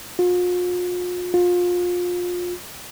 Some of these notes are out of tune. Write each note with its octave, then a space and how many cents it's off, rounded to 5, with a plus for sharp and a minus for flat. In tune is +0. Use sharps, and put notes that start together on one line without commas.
F4 +40
F4 +25